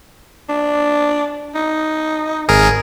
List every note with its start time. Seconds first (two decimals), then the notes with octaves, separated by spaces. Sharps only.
0.49 D4
1.55 D#4
2.48 G#1 G#4 A#4